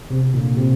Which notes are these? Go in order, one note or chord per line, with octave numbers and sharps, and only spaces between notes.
C3
A#2 D3
C3